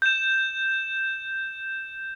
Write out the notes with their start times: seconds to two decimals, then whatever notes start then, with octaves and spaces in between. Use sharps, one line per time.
0.02 G6 E7